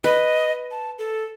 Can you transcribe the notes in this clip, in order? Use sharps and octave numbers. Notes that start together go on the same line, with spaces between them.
B4 D#5
A5
A4